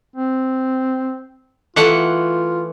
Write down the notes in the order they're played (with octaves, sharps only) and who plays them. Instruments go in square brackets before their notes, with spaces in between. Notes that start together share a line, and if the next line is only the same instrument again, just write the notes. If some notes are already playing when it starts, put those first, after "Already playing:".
[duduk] C4
[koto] E3 A3 F#5 [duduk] F4